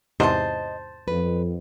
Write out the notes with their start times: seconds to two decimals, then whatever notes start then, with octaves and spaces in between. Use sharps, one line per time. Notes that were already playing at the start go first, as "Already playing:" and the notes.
0.20 E2 G#2 C3 C5 D#5 A5
1.08 F2 B4